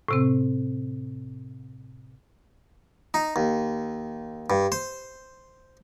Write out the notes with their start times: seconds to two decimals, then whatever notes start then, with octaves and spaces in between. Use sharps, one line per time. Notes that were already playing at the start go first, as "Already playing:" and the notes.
0.08 A2 C3 C4
3.14 D#4
3.36 D#2
4.50 G2
4.72 C5